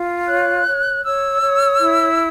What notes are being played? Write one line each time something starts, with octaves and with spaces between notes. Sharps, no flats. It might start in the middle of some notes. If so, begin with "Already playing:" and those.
Already playing: F4
C#5 F#6
C#5
C#5 E6
C#5
E4